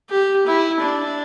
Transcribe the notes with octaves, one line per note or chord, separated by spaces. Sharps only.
G4
E4
D4